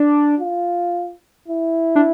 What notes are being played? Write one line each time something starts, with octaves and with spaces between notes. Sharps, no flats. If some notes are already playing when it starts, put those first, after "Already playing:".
Already playing: D4
F4
E4
D4